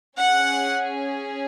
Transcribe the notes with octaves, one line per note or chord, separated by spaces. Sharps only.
C#4 G#4 F#5